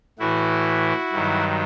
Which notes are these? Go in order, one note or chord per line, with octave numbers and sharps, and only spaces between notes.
A2 E3 E4 F#4
G2 D#3 F#3